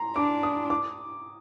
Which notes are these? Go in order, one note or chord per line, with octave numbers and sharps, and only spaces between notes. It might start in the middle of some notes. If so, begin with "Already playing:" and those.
Already playing: A#5 C6
D4 D6
D#6
D6